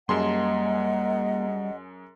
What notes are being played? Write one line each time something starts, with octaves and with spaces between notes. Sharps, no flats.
F#2 G3 A#3 G#4 D#5 F#5 A5 C6